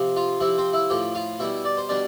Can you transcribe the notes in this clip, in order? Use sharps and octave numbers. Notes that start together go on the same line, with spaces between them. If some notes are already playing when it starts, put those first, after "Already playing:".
Already playing: C3 F3
F4 F5
C3 F3 E4 E5
C4 C5
E4 E5
A2 F3 G4 G5
F4 F5
B2 G3 E4 E5
D5
C5
B2 G3 D4 D5